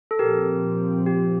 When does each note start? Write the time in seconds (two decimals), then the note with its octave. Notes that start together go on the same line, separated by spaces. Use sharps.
0.11 A4
0.19 A#2 F3 C4 G4 A#4
1.07 G4